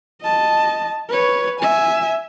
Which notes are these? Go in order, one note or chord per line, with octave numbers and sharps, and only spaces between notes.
D#5 A5
B4 C#5
E5 G#5